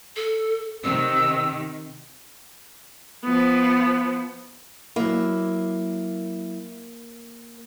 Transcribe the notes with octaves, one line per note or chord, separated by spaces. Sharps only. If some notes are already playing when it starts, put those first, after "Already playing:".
A4
C3 D#3 E6
F3 B3
F#3 A#3 E4